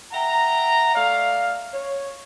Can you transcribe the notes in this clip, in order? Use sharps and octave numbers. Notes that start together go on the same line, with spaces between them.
E5 F#5 G5 A#5
A3 D5 E5 F5
C#5